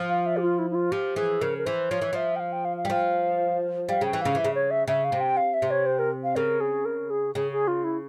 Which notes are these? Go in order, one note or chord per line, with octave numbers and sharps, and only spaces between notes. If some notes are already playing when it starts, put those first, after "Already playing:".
Already playing: F3
F5
E5
G4
F4
E4
E4
F4
F3 G4
E3 G#4
C#3 A#4
A#4
E3 C5
F3 C#5
E3
F3 E5
G5
F5
G5
F5
F5
G3
F3 F5
G3 F5
C#3 G5
E3
C#3 F5
E3 E5
C#3
C#5
E5
C#3 E5
F5
C3
G5
F5
E5
C3
C#5
C5
A#4
F5
C#3 A#4
G#4
A#4
G#4
C#3 G#4
G#4
F4
E4